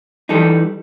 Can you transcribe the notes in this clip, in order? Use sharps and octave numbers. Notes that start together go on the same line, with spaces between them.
E3 G3 D#4 A4